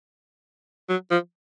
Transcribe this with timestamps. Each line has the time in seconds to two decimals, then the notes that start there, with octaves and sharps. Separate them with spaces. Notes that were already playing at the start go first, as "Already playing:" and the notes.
0.89 F#3
1.11 F3